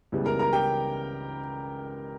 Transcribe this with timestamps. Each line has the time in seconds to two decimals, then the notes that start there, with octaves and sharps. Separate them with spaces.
0.12 C#2 C#3 E3 G3 B3
0.26 A#4 A#5
0.39 A#4 A#5
0.53 G4 G5